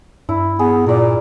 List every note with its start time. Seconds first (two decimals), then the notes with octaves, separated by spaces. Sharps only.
0.29 G2 E4
0.59 B3 G#4
0.87 A#2 A#4 D5